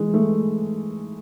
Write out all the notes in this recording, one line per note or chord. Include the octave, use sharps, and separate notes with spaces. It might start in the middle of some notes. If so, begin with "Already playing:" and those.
Already playing: E3 G#3
A3